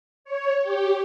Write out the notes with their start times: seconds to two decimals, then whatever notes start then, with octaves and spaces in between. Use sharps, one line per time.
0.25 C#5
0.61 G4